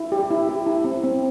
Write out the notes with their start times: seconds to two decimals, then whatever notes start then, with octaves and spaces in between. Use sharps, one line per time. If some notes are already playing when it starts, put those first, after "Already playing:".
Already playing: E4
0.12 G4
0.30 E4
0.49 G4
0.66 E4
0.84 C4
1.04 C4